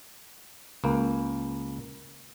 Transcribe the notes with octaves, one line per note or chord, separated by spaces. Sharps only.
C#2 A#3